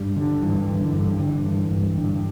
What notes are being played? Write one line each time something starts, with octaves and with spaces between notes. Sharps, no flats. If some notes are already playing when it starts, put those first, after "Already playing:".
Already playing: G2 G3
D3
G2 E3
G2
D3
G2
D3 E3
G2
G2
G2 D3